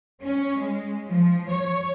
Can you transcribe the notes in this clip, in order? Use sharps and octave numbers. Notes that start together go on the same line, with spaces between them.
C#4
G#3
F3
C#5